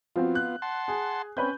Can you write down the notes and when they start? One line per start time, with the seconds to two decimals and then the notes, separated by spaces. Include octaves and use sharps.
0.16 F3 B3 C4 F4 F#4
0.35 F#6
0.62 F#5 A5 C6
0.88 G#4
1.37 C4 C#4 B4 G6